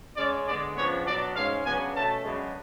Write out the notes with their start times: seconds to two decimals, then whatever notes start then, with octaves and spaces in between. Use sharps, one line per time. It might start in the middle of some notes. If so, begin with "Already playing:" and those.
0.17 C#3 G#3 C#4 D5
0.47 D3 G#3 B3 D5
0.77 C#3 F3 B3 D4 C#5
1.06 B2 F#3 B3 D4 D5
1.35 G#2 G#3 C#4 F5
1.66 C#3 F#3 B3 D4 G#5
1.95 B2 A3 C#4 A5
2.23 F#2 C#3 G#3 B3 D4